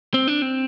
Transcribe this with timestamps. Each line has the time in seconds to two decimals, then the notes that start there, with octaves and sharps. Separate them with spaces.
0.14 C4
0.28 D4
0.42 C4